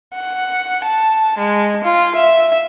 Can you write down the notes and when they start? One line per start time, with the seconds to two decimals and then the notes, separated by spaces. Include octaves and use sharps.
0.15 F#5
0.85 A5
1.38 G#3
1.85 F4
2.16 E5